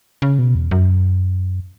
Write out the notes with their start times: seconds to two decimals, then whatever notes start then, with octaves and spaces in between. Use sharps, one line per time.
0.22 C#3
0.39 B2
0.55 E2
0.71 F#2